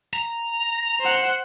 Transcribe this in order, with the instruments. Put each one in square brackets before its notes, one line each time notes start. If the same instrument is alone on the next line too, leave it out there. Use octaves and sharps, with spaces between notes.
[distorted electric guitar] A#5
[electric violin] C5 F#5